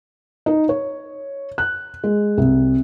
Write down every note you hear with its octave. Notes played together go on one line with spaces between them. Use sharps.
D#4
C#5
F#6
G#3
C2